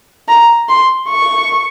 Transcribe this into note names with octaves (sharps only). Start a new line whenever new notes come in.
A#5
C6
C#6